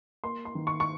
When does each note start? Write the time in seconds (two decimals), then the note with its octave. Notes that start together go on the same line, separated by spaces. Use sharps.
0.24 A#3 C6
0.45 C6
0.55 D#3
0.67 C#6
0.80 C#6